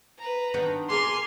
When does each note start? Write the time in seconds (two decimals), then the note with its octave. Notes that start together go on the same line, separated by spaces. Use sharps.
0.18 B4 A#5
0.54 D#3 B3 D4
0.90 G#4 A#4 G#5 C6 D6 F6